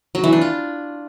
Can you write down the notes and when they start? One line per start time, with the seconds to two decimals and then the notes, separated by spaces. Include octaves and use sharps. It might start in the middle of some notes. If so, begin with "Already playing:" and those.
0.15 F#3
0.24 E3
0.33 D4
0.41 F4